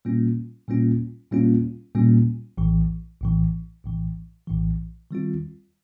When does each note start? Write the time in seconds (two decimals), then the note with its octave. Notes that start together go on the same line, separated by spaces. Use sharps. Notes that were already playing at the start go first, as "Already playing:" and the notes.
0.05 A#2 G3 A#3 C#4 F4
0.68 A#2 G3 A#3 C#4 F4
1.32 A#2 G3 A#3 C#4 F4
1.94 A#2 G3 A#3 C#4 F4
2.57 A#1 A2 E3
3.21 A#1 A2 E3
3.84 A#1 A2 E3
4.47 A#1 A2 E3
5.11 D#3 G3 C4 F4